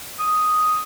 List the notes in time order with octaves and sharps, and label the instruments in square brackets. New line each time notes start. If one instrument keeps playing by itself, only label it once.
[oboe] D#6